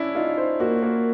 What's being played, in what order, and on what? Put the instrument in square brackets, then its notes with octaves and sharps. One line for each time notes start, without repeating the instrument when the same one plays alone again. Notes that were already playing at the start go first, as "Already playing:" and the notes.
Already playing: [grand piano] C#4 D4 E4
[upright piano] D#4 [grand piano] F4
[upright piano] C5
[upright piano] A#3 [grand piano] F#4
[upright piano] A#3